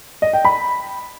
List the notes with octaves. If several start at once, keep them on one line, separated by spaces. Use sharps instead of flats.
D#5
G5
B5